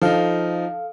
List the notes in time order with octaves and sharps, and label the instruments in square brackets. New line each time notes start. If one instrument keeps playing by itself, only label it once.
[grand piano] F3 D#4 [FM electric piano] A4 F5